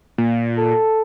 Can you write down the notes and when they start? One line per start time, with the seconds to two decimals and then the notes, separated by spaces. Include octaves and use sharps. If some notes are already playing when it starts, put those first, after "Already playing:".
0.18 A#2
0.57 A4